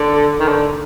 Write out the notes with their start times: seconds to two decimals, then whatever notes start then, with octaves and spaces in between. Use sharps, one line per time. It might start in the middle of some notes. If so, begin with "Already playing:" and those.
Already playing: D3
0.39 D#3
0.48 D3